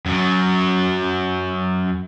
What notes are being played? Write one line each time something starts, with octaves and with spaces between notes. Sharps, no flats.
F#2 F#3